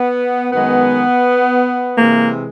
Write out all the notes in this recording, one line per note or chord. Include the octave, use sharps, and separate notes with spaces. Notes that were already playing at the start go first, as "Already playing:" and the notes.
Already playing: B3
F#2 D#3 G#3 B3
C3 E3 G#3 A#3